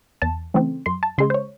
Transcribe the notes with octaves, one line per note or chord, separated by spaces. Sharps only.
E2 A5
C#3 E3 A3 C4
F#2 C6
A5
C#3 G#3 C6
C5
C#5